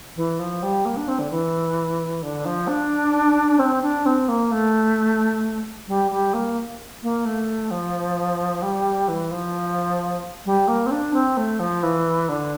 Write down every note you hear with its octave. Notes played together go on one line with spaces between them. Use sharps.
E3
F3
G3
A#3
D4
C4
D3
E3
D3
F3
D4
C4
D4
C4
A#3
A3
G3
G3
A#3
A#3
A3
F3
G3
E3
F3
G3
A#3
C4
D4
C4
A3
F3
E3
D3